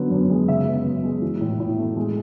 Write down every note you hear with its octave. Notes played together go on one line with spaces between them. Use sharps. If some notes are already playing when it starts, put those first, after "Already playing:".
Already playing: D3 F#3 B3
F#2
G#3
C#3 E5
B3
F#2
G#3
E3
A2
A2
A3
G#3